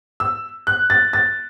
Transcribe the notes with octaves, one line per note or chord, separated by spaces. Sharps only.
E6
F#6
A6
A6